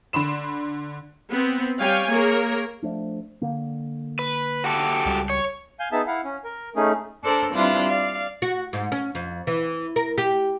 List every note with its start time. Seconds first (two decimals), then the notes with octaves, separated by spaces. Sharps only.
0.13 D3 B5 C6 E7
1.30 B3 C4
1.79 G3 C#5 F5 G5 G#5
2.10 A#3 G#4 A#4 C#5
2.82 F3 A3 D4
3.41 D3 A#3
4.19 B4
4.64 F#4 G4 A4
5.05 C#2 G3
5.30 C#5
5.80 F5 G#5 G6
5.92 B3 D#4 G#4 E5 A5
6.07 E4 F5 F#5
6.24 C#4
6.44 A#4
6.76 A3 C#4 D#4 G#4
7.23 D4 A4 A#4 C5 D5 A5
7.54 G3 C4 D4 E4 F4 B4
7.88 D5 F5
8.42 F#4
8.73 G#2
8.92 C#4
9.15 F2
9.47 E3
9.96 A#4
10.18 G4